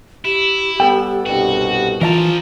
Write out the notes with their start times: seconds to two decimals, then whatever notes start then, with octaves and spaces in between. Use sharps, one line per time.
0.25 E4 G4
0.80 G3 B3 A4 G5
1.26 C2 G2 B2 F#4
2.01 E3 F3 F4 A#4 D#5 A5